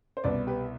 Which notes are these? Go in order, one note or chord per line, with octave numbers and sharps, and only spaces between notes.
C5
C2 B2 B4 D5
G4 B4